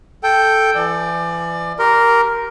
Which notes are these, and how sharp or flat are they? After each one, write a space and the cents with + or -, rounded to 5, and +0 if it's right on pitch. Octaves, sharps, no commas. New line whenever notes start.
A4 +0 G5 +0
E3 +35 D5 +25
G4 -20 A#4 +0 C6 +0